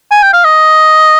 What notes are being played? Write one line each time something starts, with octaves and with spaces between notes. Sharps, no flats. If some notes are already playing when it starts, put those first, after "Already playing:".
G#5
G5
F5
D#5